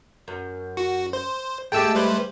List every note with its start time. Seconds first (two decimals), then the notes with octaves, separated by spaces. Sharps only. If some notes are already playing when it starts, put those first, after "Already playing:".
0.28 F#2
0.77 F#4
1.13 C5
1.72 G#3 A3 G4 G5 A5 E6
1.95 G3 B4 C5